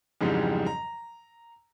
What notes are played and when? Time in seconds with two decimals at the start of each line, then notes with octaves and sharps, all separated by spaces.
0.21 F2 G#2 C#3 E3 F#3 G3
0.66 A#5